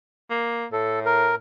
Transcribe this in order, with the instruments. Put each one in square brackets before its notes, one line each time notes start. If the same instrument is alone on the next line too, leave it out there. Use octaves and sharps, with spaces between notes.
[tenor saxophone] A#3
[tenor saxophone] A2 [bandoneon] A4
[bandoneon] A#4